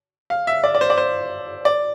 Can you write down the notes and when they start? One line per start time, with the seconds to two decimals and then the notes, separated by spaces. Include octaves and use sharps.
0.30 F5
0.47 E5
0.64 D5
0.75 D5
0.81 C5
0.90 D5
0.98 C5
1.65 D5